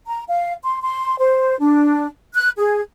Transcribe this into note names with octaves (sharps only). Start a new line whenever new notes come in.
A#5
F5
C6
C6
C5
D4
F#6
G#4